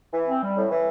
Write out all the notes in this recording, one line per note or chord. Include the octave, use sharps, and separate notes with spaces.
E3
C4
G3
A2
E3